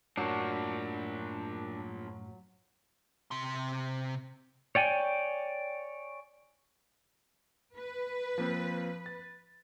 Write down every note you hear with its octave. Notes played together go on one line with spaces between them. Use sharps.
F#2 A2 F3 F#3 A#3 D4
C3 C6
C#5 D5 G5 G#5
B4
F3 A#3 C4
A6